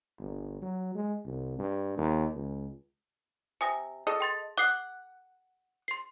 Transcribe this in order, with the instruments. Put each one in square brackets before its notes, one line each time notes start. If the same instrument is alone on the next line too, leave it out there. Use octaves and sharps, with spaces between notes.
[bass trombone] G1
F#3
G#3
C2
G2
D#2
C#2
[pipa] C3 [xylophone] G#5 D#6 A#6
[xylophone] G#4 [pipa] A4 D#5
[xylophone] G5 C6 A6
[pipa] F#5 [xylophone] D6 D#6 C7
[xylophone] C6 C7